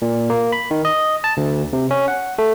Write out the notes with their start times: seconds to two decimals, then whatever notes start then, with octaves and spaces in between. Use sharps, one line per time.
0.02 A#2
0.30 A#3
0.52 B5
0.71 D#3
0.85 D#5
1.24 A5
1.37 D2
1.73 C3
1.91 C#4
2.08 F#5
2.38 A3